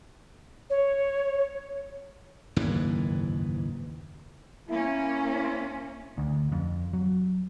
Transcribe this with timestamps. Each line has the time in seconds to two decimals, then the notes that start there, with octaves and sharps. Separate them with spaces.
0.70 C#5
2.56 F#1 D#2 G#2 E3
4.69 A#3 C#4 E4
6.18 D2
6.52 F2
6.93 F#3